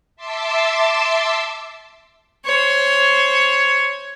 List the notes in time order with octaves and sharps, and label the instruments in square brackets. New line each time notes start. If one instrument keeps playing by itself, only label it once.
[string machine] E5 A5 C6 D6 E6
[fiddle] C5 C#5